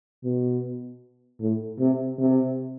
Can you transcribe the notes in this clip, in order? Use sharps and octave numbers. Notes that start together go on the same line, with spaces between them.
B2
A2
C3
C3